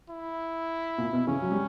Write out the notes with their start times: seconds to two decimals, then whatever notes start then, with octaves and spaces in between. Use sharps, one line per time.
0.10 E4
0.98 A#2
1.13 B2
1.27 C#3 E3 C#4
1.42 F#3
1.52 G3